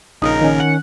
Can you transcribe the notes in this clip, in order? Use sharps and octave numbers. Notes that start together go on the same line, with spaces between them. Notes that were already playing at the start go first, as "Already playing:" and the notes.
A#1 C#3 D#4 A#4
D#3 C#4
F#5